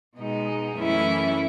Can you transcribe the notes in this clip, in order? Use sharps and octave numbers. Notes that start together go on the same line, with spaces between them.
B2 G#3 D#4
F#2 E3 A3 C#4 E4